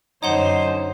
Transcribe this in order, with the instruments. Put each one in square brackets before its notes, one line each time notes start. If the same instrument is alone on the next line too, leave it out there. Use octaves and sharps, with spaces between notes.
[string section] F#2 D3 [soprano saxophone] D#4 [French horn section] C5 [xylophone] C#5 F#5 C6